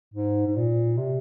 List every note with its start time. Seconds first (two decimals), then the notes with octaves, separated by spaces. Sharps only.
0.14 G#2
0.46 G#2
0.56 A#2
0.97 C3